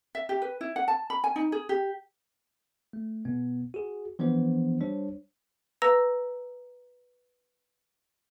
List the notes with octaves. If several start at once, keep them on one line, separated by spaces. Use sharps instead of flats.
E5
G4
B4
E4
F#5
A5
B5
G#5
D#4
G#4
G4
A3
B2 B3
F#4 G#4
E3 F3 B3 D4 C5
G3 D4 C5 C#5
B4 A#5 E6 A#6